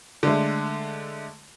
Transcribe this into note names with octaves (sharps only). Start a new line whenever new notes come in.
D3 G#3 A3